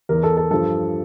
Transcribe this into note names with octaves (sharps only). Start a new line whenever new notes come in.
E2 E3 A#4
A4
A4
G2 F3 A4